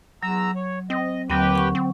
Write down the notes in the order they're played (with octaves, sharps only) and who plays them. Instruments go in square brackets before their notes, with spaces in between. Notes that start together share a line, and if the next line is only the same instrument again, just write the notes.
[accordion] E2 A#5 E6 [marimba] F#3
[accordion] C#5
[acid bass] C4 [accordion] D#5
[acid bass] D#2 [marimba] D3 F#3 C4 [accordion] G4 B4 G5
[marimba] F#5 C#6
[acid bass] C4